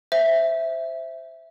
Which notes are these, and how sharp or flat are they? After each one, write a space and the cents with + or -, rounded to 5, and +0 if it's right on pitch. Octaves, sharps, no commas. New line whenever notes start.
C5 +0 E5 +0